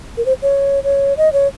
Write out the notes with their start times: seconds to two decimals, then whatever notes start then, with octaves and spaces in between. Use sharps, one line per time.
0.17 A#4
0.26 C5
0.42 C#5
0.84 C#5
1.17 D#5
1.33 C#5